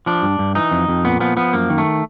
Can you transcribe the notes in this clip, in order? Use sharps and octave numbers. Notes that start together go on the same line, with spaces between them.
F3 D4
G2
G2
E3 D#4
F2
F2
A#2 B3
F3 B3
F3 B3
F#2 A#3
D#3
A3